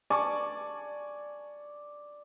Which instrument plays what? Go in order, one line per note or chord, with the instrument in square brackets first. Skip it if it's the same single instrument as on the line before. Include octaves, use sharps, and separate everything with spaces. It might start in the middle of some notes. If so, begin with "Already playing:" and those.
[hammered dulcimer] D5 [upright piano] G#5 A5 C#6